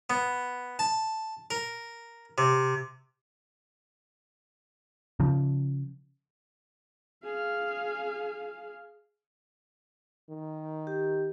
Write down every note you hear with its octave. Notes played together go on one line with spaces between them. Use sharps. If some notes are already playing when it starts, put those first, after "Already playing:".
B3
A5
A#4
C3
C#3 F3
G#4 F5
D#3
G4